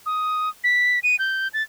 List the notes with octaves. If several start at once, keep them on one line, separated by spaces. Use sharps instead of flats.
D#6
B6
D#7
G6
A6